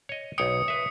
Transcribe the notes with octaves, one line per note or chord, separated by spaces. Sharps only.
C#5 D#5
B1 C#5 G5 D#6 C#7
B4 E5